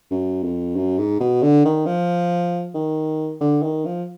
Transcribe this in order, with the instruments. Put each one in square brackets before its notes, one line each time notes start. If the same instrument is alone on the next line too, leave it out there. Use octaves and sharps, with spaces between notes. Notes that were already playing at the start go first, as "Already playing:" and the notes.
[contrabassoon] F#2
F2
F#2
G#2
B2
D3
D#3
F3
D#3
D3
D#3
F3